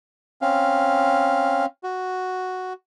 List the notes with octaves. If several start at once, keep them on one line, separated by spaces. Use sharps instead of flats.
C4 C#4 F5
F#4